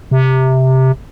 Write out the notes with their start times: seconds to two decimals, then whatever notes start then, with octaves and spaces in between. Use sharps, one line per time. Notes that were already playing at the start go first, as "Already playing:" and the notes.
0.11 C3